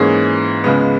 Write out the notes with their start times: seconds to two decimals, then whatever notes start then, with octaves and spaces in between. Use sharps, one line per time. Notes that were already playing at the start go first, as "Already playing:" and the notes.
Already playing: G#2 E3 A#3 C#4 G#4
0.64 C#2 C#3 G#3 B3